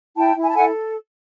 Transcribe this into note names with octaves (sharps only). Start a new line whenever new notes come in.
E4 G5 A5
E4
G#5
A5
A4 F#5 G#5